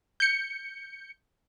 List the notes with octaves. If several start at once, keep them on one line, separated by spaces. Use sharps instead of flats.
G6 C#7